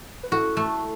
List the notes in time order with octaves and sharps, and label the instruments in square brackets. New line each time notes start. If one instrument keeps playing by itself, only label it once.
[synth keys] B4
[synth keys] E4 A4 [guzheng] F#4
[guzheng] A3